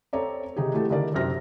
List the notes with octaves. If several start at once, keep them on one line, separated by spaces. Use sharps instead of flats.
C4 A4 C#5 D5 A#5
C3 D#3 D#4 G4 G#4
E3 A3 F#4 G4 A4
D3 D#3 D4 E4 A#4 D5
F#2 C3 C4 F6 A#6